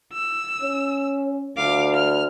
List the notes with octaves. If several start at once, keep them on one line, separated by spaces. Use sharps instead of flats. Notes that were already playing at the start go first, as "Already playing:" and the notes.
E6
C#4
D2 F5 D6
F6